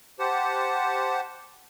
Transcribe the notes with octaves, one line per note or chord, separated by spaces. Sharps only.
G4 C5 F#5 A5